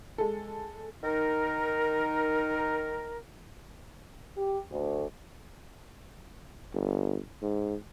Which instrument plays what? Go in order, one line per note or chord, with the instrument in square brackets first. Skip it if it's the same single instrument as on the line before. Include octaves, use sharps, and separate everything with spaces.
[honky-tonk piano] G#3 A4
[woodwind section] D#3 D#4 A#4
[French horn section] G4
D2
[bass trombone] G1
G#2